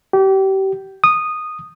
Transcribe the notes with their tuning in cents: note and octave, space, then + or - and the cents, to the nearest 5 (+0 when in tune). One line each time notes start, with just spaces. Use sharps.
G4 -30
D#6 -10